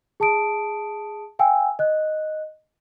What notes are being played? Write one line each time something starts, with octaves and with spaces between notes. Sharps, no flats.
G#4 A5 D#6 D7
F5 G5 G#5 E6
D#5 F#6